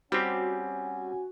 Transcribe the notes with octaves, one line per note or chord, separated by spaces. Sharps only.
G3 C4 C#4 F#4 G4 C5 F#5 G#5